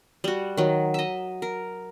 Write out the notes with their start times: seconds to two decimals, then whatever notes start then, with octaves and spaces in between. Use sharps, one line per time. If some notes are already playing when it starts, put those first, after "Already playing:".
0.24 G3 F#4
0.57 D#3 F#3
0.94 D#5 E5
1.42 A#4